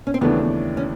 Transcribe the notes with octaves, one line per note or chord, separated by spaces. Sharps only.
C#4
C4
D#2 C#3 E3 A3 B3 D4
C#4